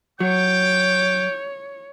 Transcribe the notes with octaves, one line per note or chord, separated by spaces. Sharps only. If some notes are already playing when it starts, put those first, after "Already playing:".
F#3 C#5 G5 D6